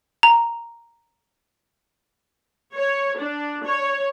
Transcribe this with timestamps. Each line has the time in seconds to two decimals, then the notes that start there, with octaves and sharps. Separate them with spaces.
0.23 A#5
2.74 C#5
3.19 D4
3.65 C#5